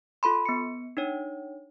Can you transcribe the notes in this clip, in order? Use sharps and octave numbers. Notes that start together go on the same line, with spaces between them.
F4 A4 B5 C6
B3 C#7
D4 D#4 C#5